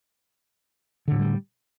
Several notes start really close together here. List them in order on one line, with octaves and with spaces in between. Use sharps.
D3 A2 F#3 G3